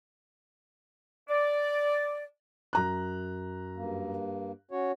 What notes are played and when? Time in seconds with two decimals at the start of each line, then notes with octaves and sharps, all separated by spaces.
1.29 D5
2.73 F#2 A#5 F#6
3.76 G2 A#3
4.71 C#4 F#4 C#5